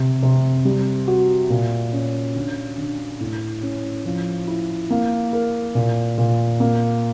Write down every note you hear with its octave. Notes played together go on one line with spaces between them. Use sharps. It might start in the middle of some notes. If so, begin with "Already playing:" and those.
Already playing: C3
C3
G3
F#4
A#2
C#4
D3
D3
A2
C#4
F3
E4
A#3
A#4
A#2
A#2
A#3